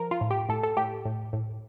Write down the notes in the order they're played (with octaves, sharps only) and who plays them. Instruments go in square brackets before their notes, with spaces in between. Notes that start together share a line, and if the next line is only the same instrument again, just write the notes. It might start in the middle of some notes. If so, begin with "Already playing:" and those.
Already playing: [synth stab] F3 A#4
F4
A2
G4
A2 A4
A4
A2 G4
A2
A2